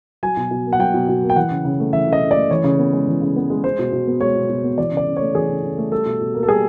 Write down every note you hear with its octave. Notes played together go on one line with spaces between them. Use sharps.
F#3 G#5
B2
B2
A#3
F#5
F#3 G5
B2
B2
A#3
G5
E3 F#5
C#3
C#3
A3
E3 E5
C#3 D#5
C#3
D5
A3
E3 C#5
C#3
B3
G#3
E3
C#3
B3
G#3
G#3 C5
B2
B2
B3
G#3 C#5
B2
B2
B3
E3 D5
C#3
D5
C#3
A3 C#5
E3 G#4
C#3
C#3
A3
G3 A4
B2
B2
A#3
A4
G3 G#4